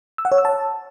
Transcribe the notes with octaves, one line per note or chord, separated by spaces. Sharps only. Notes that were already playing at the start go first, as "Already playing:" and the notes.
E6
F#5
C#5
E6
A5